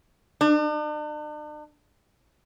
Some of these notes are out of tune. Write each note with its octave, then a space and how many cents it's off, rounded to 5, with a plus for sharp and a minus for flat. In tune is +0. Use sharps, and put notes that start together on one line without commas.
D4 +45